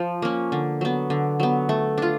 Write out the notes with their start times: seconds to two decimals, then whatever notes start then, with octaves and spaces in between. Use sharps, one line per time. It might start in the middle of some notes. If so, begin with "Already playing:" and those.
Already playing: F3
0.22 A#3 C#4
0.52 D3
0.81 F#3 B3
1.10 D3
1.40 F#3 B3
1.69 A3
1.98 D4 F4